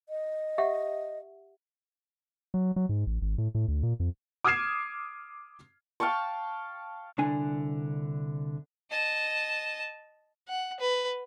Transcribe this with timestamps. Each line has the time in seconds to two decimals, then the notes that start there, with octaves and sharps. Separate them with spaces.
0.09 D#5
0.58 G4 E5 F#5
2.54 F#3
2.76 F#3
2.89 G#2
3.07 A1
3.22 G#1
3.38 A2
3.55 A2
3.68 D2
3.83 A#2
4.00 F2
4.44 D6 D#6 F6 G#6 C7 E7
6.00 F5 G5 A5 C#6
7.18 C2 D3 D4 G#5
8.91 D#5 A5
10.49 F#5
10.80 B4